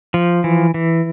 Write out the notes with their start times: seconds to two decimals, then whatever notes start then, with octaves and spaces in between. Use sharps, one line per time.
0.14 F3
0.44 E3
0.74 E3